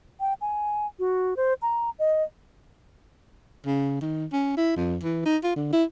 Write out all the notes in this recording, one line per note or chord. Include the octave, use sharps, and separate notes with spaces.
G5
G#5
F#4
C5
A#5
D#5
C#3
D#3
C#4
E4
F2
E3
D#4
F4
D3
E4